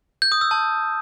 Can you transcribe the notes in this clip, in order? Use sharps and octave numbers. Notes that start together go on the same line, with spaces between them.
G6
D#6
E6
A5